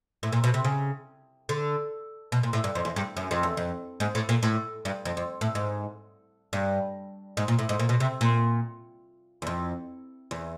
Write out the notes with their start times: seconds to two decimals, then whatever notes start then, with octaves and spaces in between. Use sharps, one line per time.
0.23 A2
0.32 A#2
0.44 B2
0.54 C3
0.65 C#3
1.49 D3
2.32 B2
2.43 A#2
2.53 A2
2.64 G2
2.75 F2
2.85 E2
2.96 G2
3.17 F#2
3.31 F2
3.43 E2
3.57 F2
4.00 G#2
4.15 A2
4.29 A#2
4.43 A2
4.85 G2
5.05 F2
5.17 F2
5.41 A2
5.55 G#2
6.53 G2
7.37 G#2
7.48 A#2
7.59 A2
7.69 G#2
7.79 A#2
7.89 B2
8.00 C3
8.21 A#2
9.42 E2
9.47 F2
10.31 E2